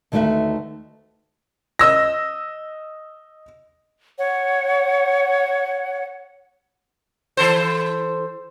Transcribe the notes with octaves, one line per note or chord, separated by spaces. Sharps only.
D2 D#3 A3 A4 B4 E5
D#5 E6 A#6
C#5 F#5
E3 A4 C5